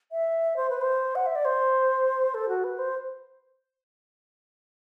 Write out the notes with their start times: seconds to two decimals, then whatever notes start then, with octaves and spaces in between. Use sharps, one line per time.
0.12 E5
0.57 C5
0.70 B4
0.82 C5
1.15 F#5
1.26 E5
1.36 D5
1.45 C5
2.34 A4
2.49 F#4
2.64 B4
2.79 C5